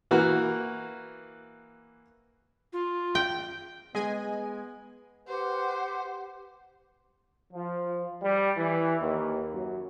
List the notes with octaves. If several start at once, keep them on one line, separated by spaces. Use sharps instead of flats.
E3 A#3 F#4
F4
G5
G#3 B3 G#4 D#5 G#5
G4 B4 C5 F#5
F3
G3
E3
D#2
F#2